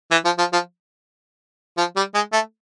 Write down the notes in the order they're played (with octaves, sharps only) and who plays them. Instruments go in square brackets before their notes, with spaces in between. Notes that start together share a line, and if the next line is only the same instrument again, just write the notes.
[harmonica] E3
F3
F3
F3
F3
G3
G#3
A3